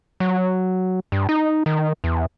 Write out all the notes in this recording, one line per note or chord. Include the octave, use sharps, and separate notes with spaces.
F#3
G2
D#4
D#3
E2